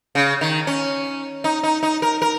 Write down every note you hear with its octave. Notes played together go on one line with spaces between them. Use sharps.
C#3
D#3
C#4
D#4
D#4
D#4
A#4
A#4